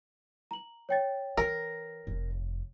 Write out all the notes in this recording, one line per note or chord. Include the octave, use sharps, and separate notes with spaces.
A#5 F#7
C#5 G5 A6
E3 A#4
F1